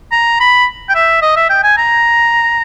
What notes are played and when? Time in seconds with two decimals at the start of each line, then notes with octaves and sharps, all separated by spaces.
0.12 A#5
0.40 B5
0.89 G5
0.95 E5
1.22 D#5
1.36 E5
1.50 G5
1.64 G#5
1.78 A#5